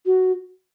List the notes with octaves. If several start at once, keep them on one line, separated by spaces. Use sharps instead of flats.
F#4